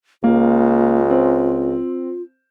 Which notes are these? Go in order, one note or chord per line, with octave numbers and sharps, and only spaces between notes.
C#2 A#3 F4
C4